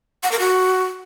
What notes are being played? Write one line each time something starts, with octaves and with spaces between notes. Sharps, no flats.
F#5
A#4
F#4